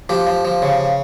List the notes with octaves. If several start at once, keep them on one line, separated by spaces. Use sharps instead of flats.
F3 G4
F3
F3
C#3